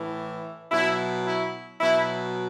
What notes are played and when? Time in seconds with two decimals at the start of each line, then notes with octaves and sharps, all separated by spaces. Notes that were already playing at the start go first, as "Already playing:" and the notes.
Already playing: A2 E3
0.72 B2 F#3 E4
1.27 E4
1.81 B2 F#3 E4